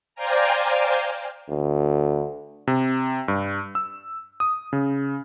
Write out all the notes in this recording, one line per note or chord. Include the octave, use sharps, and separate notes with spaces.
C5 D5 F5 G5 G#5 A#5
D2
C3
G2
E6
D#6
C#3